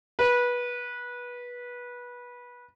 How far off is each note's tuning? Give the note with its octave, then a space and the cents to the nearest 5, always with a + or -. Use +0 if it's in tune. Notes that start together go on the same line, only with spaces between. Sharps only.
B4 -20